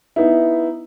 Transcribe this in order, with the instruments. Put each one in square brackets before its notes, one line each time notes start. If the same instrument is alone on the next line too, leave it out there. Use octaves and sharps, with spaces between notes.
[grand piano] B3 D#4 E4